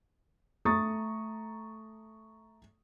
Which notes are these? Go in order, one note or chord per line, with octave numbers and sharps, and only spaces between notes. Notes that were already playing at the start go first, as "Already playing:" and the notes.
A3 A#5 C#6 D#6 A6